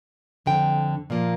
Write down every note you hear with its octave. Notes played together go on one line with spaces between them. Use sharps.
F2 D3 G5
A#2 F3 A#3